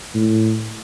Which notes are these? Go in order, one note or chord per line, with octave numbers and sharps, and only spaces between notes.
A2